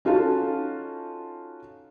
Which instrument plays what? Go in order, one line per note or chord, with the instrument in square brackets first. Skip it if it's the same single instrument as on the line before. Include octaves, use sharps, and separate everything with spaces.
[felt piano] C#4 D#4 F4 F#4 A4 A5